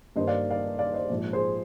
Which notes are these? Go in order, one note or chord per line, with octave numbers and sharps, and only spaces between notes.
G2 D#3 A#3 C5 D#5
D5 F5
D5 F5
D5 F5
C5 D#5
A#1 G#2 F3
G#4 C5